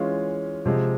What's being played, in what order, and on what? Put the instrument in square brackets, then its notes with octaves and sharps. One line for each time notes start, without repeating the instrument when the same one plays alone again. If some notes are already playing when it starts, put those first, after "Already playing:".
Already playing: [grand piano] E3 G#3 C#4 F4
C3 F3 G#3